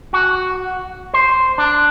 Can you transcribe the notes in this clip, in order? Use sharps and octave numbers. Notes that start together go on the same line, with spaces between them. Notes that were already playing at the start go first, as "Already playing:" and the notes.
F#4
C5
D4